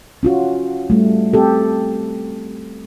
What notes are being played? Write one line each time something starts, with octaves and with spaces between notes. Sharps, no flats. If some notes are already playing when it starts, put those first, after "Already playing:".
C#4 F4 F#4
G3 A3
C4 G4 A4